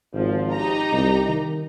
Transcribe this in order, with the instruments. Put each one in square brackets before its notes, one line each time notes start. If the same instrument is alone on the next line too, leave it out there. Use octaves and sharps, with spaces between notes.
[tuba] G#1 [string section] F3
[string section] D#4 G4 A#5
[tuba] C2
D#3